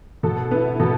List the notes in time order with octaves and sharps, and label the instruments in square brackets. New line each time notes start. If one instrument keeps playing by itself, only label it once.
[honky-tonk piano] B2 A4
B3 E4
B2 A4